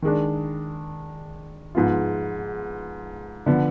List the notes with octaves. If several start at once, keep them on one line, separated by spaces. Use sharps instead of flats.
D#3 G#3 D4
G#2 F3 B3 F4
D3 F3 B3